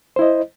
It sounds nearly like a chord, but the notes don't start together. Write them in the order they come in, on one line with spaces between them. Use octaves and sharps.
C5 E4 D#5